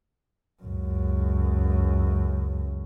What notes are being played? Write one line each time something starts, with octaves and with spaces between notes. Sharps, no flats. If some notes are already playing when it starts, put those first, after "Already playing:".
C#2 F#2